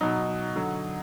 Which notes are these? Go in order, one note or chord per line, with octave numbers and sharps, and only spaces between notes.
B2 F#3 D#4
D3 F#3